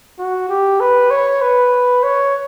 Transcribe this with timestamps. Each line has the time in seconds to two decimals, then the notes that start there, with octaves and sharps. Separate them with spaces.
0.19 F#4
0.49 G4
0.80 B4
1.11 C#5
1.42 B4
2.03 C#5